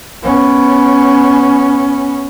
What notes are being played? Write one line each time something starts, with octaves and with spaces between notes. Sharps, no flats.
B3 C#4